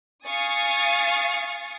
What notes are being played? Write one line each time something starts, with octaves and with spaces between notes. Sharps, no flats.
F5 G#5 C#6 D#6 A6